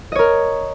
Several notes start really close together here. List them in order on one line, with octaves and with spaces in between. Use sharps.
D#5 C#5 A#4